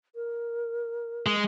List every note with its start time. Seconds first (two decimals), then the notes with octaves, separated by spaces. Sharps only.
0.15 A#4
1.26 G#3